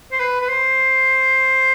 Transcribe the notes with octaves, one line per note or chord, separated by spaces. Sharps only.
C5
B4
B4
C5